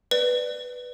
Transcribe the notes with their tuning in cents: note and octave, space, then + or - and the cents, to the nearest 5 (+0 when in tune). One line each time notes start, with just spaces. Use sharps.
B4 +0 D5 +10